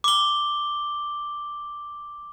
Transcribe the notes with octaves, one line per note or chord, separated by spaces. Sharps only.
D6 G7